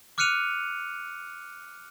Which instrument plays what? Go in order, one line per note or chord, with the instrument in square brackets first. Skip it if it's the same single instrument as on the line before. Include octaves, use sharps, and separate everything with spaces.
[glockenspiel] D6 F6 F#6 C#7 D#7 F7